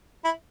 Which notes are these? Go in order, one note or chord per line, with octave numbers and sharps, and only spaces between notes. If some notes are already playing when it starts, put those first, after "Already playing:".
E4